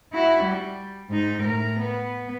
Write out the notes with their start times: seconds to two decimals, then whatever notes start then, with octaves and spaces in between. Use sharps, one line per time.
0.13 E4 F#4
0.44 G3
1.09 G#2 D#4
1.43 A2 A#4
1.80 B3